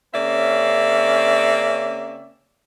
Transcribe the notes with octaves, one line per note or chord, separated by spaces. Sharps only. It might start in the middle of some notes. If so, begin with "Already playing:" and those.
C#3 A#3 C4 C#4 D5 E5